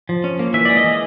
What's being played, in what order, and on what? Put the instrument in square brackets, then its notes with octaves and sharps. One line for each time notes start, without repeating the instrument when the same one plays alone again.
[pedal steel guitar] F3
C#4
A#3
E3 E5
G#3 D5
D#5
E3